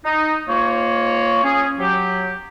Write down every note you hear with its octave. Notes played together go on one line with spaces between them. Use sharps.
D#4
G#2 A#3 F4 C#5
C#4 G#4
F#3 G4